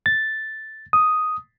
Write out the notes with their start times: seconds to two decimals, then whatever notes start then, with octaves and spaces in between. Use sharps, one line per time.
0.06 A6
0.93 D#6